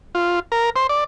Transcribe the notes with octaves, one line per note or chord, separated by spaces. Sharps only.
F4
A#4
C5
D5